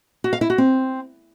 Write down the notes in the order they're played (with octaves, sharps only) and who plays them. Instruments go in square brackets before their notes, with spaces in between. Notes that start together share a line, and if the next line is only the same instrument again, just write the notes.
[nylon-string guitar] F#4
F5
E4
F#4
C4